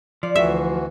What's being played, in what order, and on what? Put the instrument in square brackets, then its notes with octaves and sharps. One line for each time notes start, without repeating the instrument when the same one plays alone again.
[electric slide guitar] F3 [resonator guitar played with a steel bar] D5
[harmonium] D2 E3 F#4 [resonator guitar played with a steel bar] G#4 A4 [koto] E5